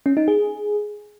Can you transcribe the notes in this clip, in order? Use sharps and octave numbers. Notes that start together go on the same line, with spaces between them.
C#4
D#4
G#4